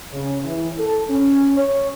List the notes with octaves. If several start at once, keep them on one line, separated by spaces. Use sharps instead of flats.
C#3
E3
A4
C#4
C#5